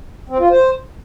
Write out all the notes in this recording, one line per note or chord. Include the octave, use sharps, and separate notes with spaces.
C4
F4
C5